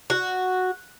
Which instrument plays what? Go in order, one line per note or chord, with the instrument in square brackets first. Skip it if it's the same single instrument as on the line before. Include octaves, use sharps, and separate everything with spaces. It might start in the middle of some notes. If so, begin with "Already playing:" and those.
[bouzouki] F#4